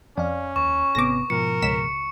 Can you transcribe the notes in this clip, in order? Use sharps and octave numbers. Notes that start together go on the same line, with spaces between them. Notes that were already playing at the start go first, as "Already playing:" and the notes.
F2 C#4 D5 F5
D#2 C#6
G#1 C3 B3 D6 A#6
G#2 B2 F3 A#4 C#7
C#2 B6 E7